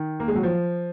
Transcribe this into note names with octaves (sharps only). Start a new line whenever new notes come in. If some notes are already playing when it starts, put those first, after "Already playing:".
Already playing: D#3
A#3
G#3
F#3
F3